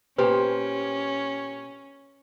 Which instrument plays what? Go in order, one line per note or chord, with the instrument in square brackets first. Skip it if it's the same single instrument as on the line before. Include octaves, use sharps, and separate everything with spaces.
[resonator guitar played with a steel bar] A#2 G4 C5 [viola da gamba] C#4 [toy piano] B4